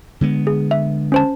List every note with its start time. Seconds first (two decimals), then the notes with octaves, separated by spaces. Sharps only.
0.21 D3 G#3 B3
0.47 G#4
0.71 E5
1.12 C#4 C5 A5